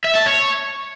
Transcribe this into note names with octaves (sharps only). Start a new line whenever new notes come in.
E5
A5
C#5